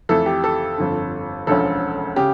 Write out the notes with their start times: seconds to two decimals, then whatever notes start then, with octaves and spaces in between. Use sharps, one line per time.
0.09 F2 E3 A3 A4
0.26 G4
0.44 A4
0.78 G1 F2 D3
1.47 E1 D2 D3 F3 C#4 A4
2.16 C#3 G4